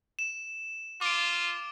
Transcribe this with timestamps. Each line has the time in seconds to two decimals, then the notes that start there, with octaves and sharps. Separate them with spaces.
0.19 E7
1.01 F4 D6 D7